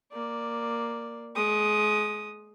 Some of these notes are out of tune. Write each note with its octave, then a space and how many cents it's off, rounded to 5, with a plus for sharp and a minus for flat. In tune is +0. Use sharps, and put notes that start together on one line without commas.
A#3 +0 D5 +0
G#3 +30 D#6 +0